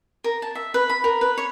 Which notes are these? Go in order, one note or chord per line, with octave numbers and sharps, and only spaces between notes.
A#4
A5
E5
B4
B5
A#4
B4
C#5